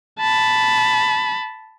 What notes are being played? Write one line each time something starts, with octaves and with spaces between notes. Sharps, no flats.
A5 B5